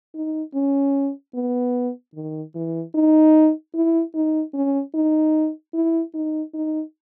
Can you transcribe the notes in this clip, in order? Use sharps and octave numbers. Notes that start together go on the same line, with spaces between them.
D#4
C#4
B3
D#3
E3
D#4
E4
D#4
C#4
D#4
E4
D#4
D#4